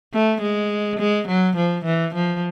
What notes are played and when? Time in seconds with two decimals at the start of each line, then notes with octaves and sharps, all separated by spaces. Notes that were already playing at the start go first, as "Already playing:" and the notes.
0.13 A3
0.41 G#3
0.99 G#3
1.28 F#3
1.56 F3
1.85 E3
2.14 F3